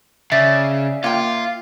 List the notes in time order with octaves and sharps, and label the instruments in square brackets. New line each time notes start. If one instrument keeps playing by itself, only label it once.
[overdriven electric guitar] C#3 [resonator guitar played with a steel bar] D5 [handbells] E5
[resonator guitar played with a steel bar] A#3 G5 [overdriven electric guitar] F4